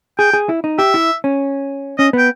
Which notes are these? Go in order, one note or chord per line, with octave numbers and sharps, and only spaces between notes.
G#4 G5
G#4
E4
D#4
G4 E5
E4
C#4
C#4 D#5
B3
G5